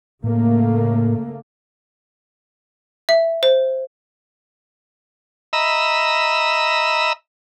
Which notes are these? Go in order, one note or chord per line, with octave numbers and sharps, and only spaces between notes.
A2 C#3 A3 A#3
E5
C5
D#5 E5 A#5 B5 E6